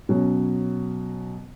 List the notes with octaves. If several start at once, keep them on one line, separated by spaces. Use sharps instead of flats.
B2 F#3 C#4